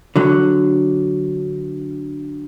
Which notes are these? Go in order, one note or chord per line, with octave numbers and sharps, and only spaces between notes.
D3 F#3